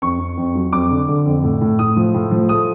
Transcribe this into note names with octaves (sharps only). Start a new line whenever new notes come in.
F2 C#6
F2
F2
F#3
F2 D6
D3
D3
F2
A2
A2
A2 D#6
F3
A2
F3
A3 D#6